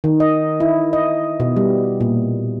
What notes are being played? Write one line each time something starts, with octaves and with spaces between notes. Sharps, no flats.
D#3
D#5
E4
D#5
B2
G3
A#2